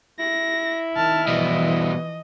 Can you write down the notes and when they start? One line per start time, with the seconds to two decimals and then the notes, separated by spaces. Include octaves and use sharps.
0.19 E4 A#6
0.96 D#3 A5 F6
1.28 B2 E3 F3 G3 D#5